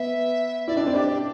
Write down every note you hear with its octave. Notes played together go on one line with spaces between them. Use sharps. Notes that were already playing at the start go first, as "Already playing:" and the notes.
Already playing: B3 E5
E4 D5
D4
C4
D4 G4